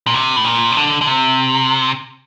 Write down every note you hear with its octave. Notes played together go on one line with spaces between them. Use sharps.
A#2
C3
A2
A#2
C3
D3
D3
C3